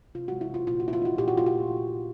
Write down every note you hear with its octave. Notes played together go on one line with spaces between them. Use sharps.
C3 F4
G#3 F#4
E4
C3 F4
A#2 F4
F#4
A#3 E4
F4
D#4 F#4
A#2 G4
F#4
A3 F4
F#4
A#2